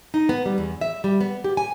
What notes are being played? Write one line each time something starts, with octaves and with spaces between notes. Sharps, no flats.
D#4
B3
G3
E2
E5
G3
B3
G4
G#5